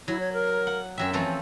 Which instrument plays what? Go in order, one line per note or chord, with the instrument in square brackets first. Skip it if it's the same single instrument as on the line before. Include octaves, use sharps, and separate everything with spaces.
[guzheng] F#3 [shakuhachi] E4
[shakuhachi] C#5
A#4
[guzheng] F#5
[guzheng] F#2 F#3 E5 [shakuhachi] G5
[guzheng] E3 F3 A3 [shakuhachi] C4